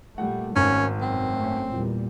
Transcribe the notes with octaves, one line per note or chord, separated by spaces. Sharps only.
A#2 G3 A3 F#5
G#1 G#2 D#3 C#4
F#2 B2 C4
A3 C#4
E2 A#2 G3